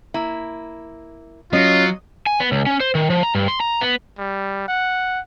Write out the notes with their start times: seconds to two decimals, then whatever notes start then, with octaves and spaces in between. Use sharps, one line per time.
0.14 A#3 E4
1.53 F#3 C#4 F4 D#5
2.27 G#5
2.40 B3
2.52 C#2
2.66 C#4
2.80 C5
2.95 D#3
3.10 F3
3.23 A#5
3.35 G2
3.48 C6
3.60 A#5
3.81 B3
4.18 G3
4.68 F#5